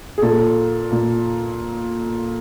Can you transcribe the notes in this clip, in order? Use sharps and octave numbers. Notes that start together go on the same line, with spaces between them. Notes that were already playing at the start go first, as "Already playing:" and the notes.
G#4
A#2 A4
A#2